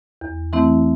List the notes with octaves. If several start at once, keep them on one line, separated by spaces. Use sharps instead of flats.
E2
E3 A3 C4 E4